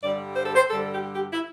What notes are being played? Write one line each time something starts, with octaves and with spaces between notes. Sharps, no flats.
G2 D3 G3 D5
C5
A4
C5
G2 D3 G3 A4
G4
G4
E4